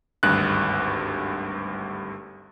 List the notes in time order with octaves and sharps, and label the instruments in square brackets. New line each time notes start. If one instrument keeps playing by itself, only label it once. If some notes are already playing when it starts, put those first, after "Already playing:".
[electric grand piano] G#1 D2 G2 F#6